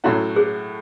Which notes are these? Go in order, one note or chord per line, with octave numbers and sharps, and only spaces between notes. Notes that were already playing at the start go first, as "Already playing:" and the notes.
A2 F#3 A3 C#4 E4 F#4
G#4